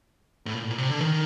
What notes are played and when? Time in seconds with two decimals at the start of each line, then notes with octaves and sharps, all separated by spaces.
0.46 A2
0.54 A#2
0.62 A2
0.70 A#2
0.78 C3
0.89 D3
1.00 D#3